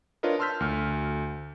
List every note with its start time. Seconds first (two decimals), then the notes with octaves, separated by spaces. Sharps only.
0.23 D4 F4 A#4 B4 C#5 D#5
0.39 A5 C6 E6 F6 G6 B6
0.60 D2 F6